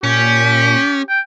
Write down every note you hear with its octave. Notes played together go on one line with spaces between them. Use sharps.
A#2 C#4 G4
G5